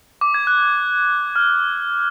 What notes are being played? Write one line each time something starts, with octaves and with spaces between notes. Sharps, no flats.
D6
G#6
F#6
F6